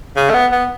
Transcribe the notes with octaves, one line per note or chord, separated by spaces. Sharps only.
C#3
A3
B3
B3